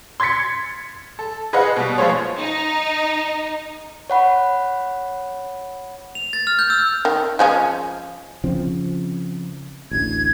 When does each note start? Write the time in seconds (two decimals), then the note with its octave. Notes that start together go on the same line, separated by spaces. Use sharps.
0.20 C6 G#6 A6 B6 C#7
1.19 A4
1.53 G#4 B4 C5 D#5 F5 F#5
1.76 B2 G3
1.98 F3 G#3 F4 G#4 C5 C#5
2.38 D#4
4.10 C#5 F#5 B5
6.15 F7
6.33 A6
6.47 F6
6.59 G6
6.70 E6
7.05 D#3
7.39 F3 G#3 C#4
8.44 C#3 F3 C4
9.91 A1 D2 G#6